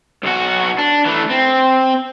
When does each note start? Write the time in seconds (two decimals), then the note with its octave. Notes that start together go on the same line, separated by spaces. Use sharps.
0.24 B1 F#4
0.79 D4
1.06 E3 A3
1.30 C4